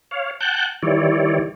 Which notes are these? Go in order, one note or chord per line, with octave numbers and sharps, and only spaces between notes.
C#5 F5
F#5 G5 A5 F#6 G6
D#3 E3 G3 E4 C#5 D5